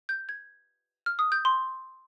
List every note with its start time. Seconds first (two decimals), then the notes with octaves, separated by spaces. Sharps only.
0.09 G6
0.29 G#6
1.06 F6
1.19 D#6
1.32 G6
1.45 C6